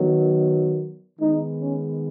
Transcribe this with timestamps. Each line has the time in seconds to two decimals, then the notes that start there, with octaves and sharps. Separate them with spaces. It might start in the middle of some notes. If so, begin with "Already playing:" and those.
Already playing: D#3 F#3 B3
1.20 D#3 G#3 B3 D#4
1.61 C#4